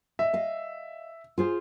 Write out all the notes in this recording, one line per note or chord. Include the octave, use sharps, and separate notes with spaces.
D#5 E5
D#5 F5
F4 G#4 C5